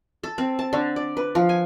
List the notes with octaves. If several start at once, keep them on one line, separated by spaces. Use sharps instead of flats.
A4
C4
A5
D3
D5
B4
F3
G#5